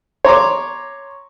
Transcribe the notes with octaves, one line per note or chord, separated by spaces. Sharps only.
C#5 A#5 C6 D6